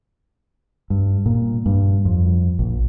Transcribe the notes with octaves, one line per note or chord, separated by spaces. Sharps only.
G2
A#2
G2
F2
A#1